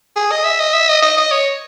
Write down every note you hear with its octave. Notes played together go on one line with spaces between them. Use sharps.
G#4
D#5
E5
D#5
E5
D#5
D#5
D#5
C#5